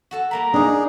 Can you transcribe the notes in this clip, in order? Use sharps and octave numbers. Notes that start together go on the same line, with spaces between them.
F#4 A4 A5
G3 A#3 A#5 B5
D4 D#4 G#4